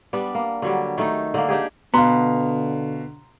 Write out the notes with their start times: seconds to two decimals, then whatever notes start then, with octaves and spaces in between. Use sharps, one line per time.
0.13 G3 B3 D4
0.35 A#3
0.62 D3 F#3 G3
0.98 D#3 A3 D#4
1.34 D3 A#3
1.48 D4 D#4 G4 G#4
1.94 B2 D3 B3 F5 A#5 C6